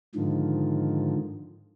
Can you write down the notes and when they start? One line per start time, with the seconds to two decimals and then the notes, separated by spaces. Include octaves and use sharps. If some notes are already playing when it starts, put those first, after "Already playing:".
0.15 G#2 D3 D#3 F3